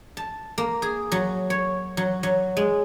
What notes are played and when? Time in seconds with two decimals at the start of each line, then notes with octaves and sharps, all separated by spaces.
0.17 A5
0.58 A#3
0.82 G#4
1.12 F#3
1.50 C#5
1.97 F#3
2.23 F#3
2.57 G#3